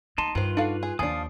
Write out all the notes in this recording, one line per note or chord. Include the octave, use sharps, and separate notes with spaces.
A#3 D#4 A5 C6
G2 D#3 F4 B4 C5
D4 D#4 F#4 A4 F5
G#4
D#2 F3 D4 F5 G#5 D#6